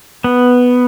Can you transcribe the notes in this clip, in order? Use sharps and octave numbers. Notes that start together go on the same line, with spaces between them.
B3